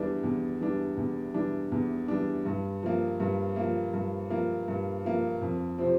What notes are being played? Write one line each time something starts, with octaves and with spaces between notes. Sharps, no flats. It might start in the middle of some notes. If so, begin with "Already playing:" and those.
Already playing: E2 E3 G3 D4
E2
E3 G3 D4
E2
E3 G3 D4
E2
E3 G3 D4
G2
F3 A#3
G2
F3 A#3
G2
F3 A#3
G2
F3 A#3
F2
C3 F3 C4